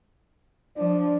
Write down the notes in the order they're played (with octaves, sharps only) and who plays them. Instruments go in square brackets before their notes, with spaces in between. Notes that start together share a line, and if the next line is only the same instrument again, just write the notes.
[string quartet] F3 [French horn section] D4 D5